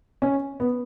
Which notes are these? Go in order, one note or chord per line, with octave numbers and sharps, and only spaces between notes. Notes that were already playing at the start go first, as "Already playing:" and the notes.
C#4
B3